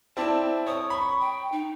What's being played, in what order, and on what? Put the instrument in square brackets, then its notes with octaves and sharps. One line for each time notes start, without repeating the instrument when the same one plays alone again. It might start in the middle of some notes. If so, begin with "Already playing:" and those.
[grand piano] C4 E4 D5 [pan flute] A5
[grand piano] C#5 [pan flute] D#6
[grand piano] B5 [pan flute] C#6
[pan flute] G5
D#4